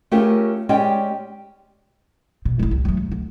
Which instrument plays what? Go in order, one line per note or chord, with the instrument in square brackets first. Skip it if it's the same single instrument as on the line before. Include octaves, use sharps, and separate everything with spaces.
[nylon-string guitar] A3 C#4 F4 G4 G#4 A#4
G#3 C#4 G4 G#4 D5 G5
[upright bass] B2
A#1 E4
C2
F#3 A3
E1
D2